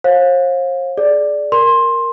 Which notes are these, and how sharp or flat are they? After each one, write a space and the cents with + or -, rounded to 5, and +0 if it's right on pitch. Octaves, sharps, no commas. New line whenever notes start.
C5 +45 F5 +25
G#4 +25 D5 +0
A#4 +0 C6 +15